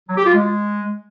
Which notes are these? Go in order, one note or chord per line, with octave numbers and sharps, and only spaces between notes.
F#3
G4
F4
G#3